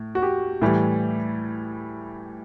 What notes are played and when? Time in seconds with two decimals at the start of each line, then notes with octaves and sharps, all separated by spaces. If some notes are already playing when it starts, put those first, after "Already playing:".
Already playing: A2
0.15 F#4
0.22 G4
0.62 A2 E3 G3